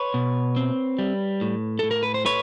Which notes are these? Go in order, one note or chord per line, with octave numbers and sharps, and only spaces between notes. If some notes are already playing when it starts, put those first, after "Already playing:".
Already playing: B4 C#5
B2
C4
G3
A2
A2 A4
A#4
B4
C5
A3 B4 C#5